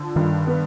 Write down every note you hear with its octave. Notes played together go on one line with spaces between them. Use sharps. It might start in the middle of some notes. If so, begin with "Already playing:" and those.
Already playing: D3 F3
G2 D#3
B3